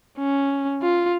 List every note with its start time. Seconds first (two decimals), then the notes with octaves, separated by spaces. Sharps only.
0.19 C#4
0.82 F4